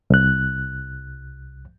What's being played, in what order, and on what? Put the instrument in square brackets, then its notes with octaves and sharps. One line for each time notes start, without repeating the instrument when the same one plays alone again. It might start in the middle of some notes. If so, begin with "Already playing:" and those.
[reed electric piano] C2 F#6